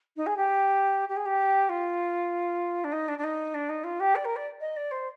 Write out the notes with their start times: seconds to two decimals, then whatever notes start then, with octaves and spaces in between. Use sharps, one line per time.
0.16 D#4
0.26 G#4
0.36 G4
1.08 G4
1.16 G#4
1.25 G4
1.69 F4
2.84 D4
2.92 D#4
3.08 D4
3.18 D4
3.23 D#4
3.54 D4
3.69 D#4
3.84 F4
4.00 G4
4.15 D5
4.24 A#4
4.36 D5
4.60 D#5
4.76 D5
4.91 C5